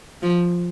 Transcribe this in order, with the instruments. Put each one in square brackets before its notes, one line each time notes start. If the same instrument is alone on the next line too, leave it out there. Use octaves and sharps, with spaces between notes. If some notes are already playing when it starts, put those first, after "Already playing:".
[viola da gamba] F3